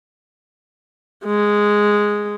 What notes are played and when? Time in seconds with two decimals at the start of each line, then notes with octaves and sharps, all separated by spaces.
1.25 G#3